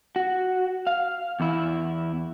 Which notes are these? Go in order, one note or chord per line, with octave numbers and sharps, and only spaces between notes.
F#4
F5
E2 E4